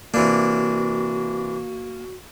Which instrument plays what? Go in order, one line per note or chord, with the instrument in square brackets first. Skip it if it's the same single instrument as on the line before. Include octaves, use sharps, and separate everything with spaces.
[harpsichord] C3 E3 D4 [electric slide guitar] A#3 [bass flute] F#4